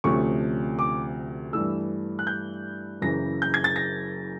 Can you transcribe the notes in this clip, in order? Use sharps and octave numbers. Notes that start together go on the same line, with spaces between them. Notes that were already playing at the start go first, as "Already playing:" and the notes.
D2 C3 F3 A3 C#4 C#6
D6
G2 E3 A3 E6
F#6
G6
F#1 F#2 C#3 E3 A#6
G6
G#6
A6
A#6